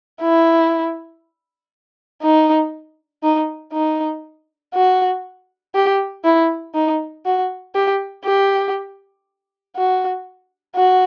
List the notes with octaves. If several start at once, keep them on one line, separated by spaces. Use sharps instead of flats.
E4
D#4
D#4
D#4
F#4
G4
E4
D#4
F#4
G4
G4
F#4
F#4